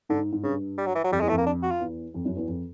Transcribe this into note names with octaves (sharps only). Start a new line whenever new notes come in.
G#2 D3
G#2
G2 C#3
G3
F#3
E3
F#3
F2 G3
E2 G#3
A3
F2
A#3
D4
F#4
F4
E2
F2
F#2
E2
F2